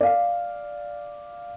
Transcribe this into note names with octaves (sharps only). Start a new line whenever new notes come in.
D5 F5